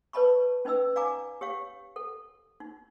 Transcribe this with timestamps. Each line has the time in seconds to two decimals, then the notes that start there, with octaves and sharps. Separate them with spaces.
0.13 B4 C#5 D#5 A5 B5 C#6
0.65 C#4 D#4 B4 D#5 E6
0.96 D5 F5 G#5 A#5 D6
1.41 G4 C#5 F5
1.96 A4
2.60 D#4